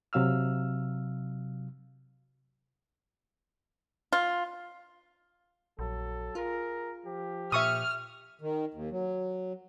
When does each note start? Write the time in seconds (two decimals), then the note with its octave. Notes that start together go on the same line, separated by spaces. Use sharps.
0.13 C3 F#3 F5 E6 F6
4.13 F4
5.79 A#1 F#3 A4
6.35 F4 G#4 A#4
7.04 F3 G4
7.52 A#2 E5 C#6 D#6 F6
8.41 D#3
8.74 D#2
8.91 F#3